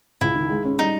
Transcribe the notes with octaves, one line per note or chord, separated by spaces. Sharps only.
C#2 E4
D#3
G#3
C#4
G3 D#4